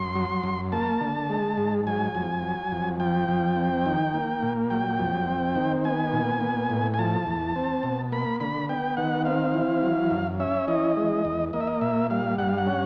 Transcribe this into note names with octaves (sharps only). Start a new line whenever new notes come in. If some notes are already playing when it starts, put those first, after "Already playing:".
Already playing: F#2 C6
F#3
F#2
A#3 A5
D3
G#3
G#2
F#3 G#5
F2
F#3
F2
F3 G5
F2
C4
D#3
A#3
A#2
F#3 G5
F2
C4
D#3
B3 G#5
A#2
B3
A2
G#5
F3 A5
E2
C4
B2
A#3 B5
D3 B5
B3 G5
D#3 F#5
C4 F5
E3
F#3
F#2
C#4 E5
E3 D#5
G#3
E2
A#3 D#5
E5
D#5
A#2 E5
G3 F5
G2 F#5
F5
F#5
C#4